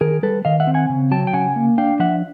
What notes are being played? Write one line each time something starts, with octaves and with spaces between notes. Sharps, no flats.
D#3 G#4 A#4
G3 A4 B4
D#3 D#5 F5
E5 F#5
C4
F#5 G#5
C#3
F#3 G5 A5
G5
C#3 F#5 G#5
A#3
D4 F5 G5
F3 E5 F#5